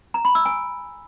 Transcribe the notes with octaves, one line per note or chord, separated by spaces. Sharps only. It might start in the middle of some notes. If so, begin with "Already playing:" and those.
A#5
B5
E6
G#5